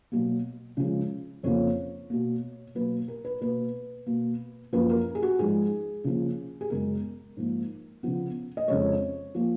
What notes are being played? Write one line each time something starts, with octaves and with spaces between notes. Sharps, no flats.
B2 F#3 A#3
C#3 F3 G#3
F2 C#3 F3 A#3 C#5
B2 A#3
B2 F#3 A#3 B4
A#4
B4
B2 A#3 B4
B2 A#3
F#2 F3 A#3 B4
A#4
G#4
F#4
G#2 F3 G#3 G#4
C#3 F3 A#3
G#4
F#2 C#3 G#3 B3 A#4
G#2 F3 A#3
C#3 F3 B3
D#5
F2 C#3 G#3 C#5
F3 A#3